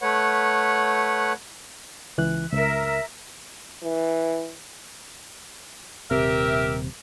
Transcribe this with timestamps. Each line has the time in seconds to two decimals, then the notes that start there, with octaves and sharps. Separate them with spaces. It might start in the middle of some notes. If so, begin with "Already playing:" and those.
0.01 A3 B4 C#5 F#5
2.18 C#2 E3 F#6
2.52 C#2 A#4 E5
3.83 E3
6.11 D#1 G#1 C3 G4 A#4 E5